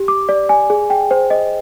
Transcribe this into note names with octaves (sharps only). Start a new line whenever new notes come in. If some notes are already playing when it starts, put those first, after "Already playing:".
Already playing: G4
D6
D5
G#5
G#4
G5
C5
D#5